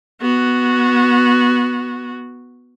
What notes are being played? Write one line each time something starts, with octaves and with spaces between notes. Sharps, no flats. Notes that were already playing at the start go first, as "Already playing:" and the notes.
B3 F#4